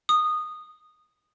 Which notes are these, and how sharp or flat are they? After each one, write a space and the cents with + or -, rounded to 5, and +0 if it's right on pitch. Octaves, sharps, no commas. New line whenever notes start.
D#6 -15